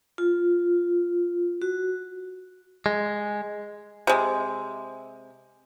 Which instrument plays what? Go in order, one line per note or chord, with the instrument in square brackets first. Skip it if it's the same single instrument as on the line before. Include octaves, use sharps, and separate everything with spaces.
[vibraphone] F4
F#4
[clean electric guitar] G#3
[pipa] C3 G#3